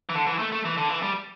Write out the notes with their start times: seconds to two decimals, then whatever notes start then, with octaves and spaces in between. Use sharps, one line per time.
0.09 E3
0.15 D3
0.27 E3
0.39 A3
0.52 A3
0.65 E3
0.78 D3
0.89 E3
1.02 G3